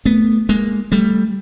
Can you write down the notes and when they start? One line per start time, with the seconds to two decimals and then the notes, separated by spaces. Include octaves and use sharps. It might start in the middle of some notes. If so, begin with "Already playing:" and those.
0.05 A3 B3
0.49 G#3 A#3
0.92 G3 A3